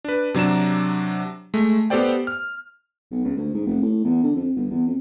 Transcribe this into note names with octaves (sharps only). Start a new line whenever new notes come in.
D4 B4
C3 F#3 D4 A#5 E7
G#3 A3
B3 G4 A4 C5 D5 G5
F6
B1
C#2
D2
G#2
F1
A2
E2
D3
F2
G1
E2
F2